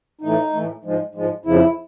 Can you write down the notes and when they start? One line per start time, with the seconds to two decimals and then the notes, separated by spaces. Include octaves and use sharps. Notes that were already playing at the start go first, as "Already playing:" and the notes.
0.21 A2 E3 A3 D#4
0.53 A2 E3 A3
0.84 G#2 F3 G#3
1.15 G#2 F3 G#3
1.45 F2 C#3 F3 E4